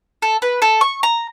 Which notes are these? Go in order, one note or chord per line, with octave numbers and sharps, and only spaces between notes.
A4
B4
A4
C#6
A#5